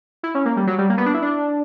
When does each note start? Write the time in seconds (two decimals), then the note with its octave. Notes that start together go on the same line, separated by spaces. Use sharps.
0.23 E4
0.35 C#4
0.45 A#3
0.57 G3
0.67 F#3
0.78 G3
0.90 A#3
0.97 B3
1.06 D4
1.14 E4
1.22 D4